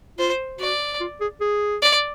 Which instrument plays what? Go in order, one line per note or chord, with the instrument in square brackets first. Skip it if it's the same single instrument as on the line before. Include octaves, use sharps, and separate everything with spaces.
[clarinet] F4 [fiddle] C5
[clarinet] F#4 [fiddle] D5
[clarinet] F4
G#4
G#4
[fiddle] D5